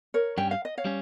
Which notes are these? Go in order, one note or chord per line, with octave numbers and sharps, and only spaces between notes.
A#4 C#5
G2 G3 C#4 G5
F5
D#5
C#5 F5
G3 C#4